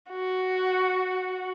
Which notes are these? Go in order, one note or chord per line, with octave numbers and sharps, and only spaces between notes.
F#4